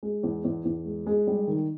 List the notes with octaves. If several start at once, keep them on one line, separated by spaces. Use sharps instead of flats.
G#3
E2
E2
E2
G#3
G#3
G3
D#3